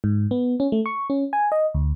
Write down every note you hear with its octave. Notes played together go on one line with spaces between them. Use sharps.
G#2
B3
C#4
A3
C#6
C#4
G#5
D#5
D2